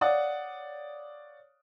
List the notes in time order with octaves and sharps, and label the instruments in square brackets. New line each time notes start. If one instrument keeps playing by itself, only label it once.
[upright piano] C#5 D5 F5 F#5 D#6